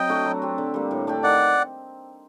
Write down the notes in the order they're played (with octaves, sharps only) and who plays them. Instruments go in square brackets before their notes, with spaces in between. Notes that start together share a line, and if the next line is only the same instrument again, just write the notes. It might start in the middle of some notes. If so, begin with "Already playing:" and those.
Already playing: [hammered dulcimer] F#3 C4 [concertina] D#5 G5
[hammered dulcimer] A3 D4 F#4
F#3
C4 G4
D3
G3 A#3
A2
A3 D4 G4
[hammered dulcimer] D#3 [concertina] D5 F#5